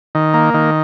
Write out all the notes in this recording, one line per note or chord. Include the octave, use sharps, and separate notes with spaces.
D#3
A#3
D#3